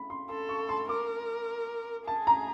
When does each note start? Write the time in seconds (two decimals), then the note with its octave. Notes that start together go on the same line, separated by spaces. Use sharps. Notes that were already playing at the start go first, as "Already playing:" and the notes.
Already playing: B5
0.10 C6
0.29 A4 C6
0.49 C#6
0.69 C6
0.89 A#4 D6
2.07 G#4 A5
2.27 A#5